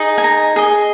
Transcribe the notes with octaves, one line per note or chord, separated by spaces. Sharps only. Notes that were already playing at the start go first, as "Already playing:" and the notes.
Already playing: D#4 G#4 D#5
G#5
A#5
G#4 D#5